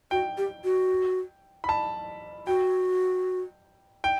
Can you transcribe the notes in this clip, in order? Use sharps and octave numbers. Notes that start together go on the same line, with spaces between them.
F#4 G5
G4
F#4
B5
A5
F#4 G5
G5